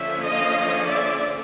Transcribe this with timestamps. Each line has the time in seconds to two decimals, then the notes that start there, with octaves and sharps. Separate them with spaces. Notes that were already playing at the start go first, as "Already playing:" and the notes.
Already playing: D3 F3 A#3 C#4 E5
0.23 D#5 F5
0.87 D5 E5